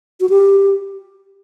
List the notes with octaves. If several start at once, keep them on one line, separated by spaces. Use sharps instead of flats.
F#4
G4